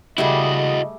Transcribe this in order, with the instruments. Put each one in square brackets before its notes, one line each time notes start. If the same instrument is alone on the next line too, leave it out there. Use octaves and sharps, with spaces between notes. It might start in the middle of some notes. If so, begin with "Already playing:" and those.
[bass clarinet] C#3 [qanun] G3 A3 G#4 [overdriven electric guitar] E4 F#4 [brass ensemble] D#5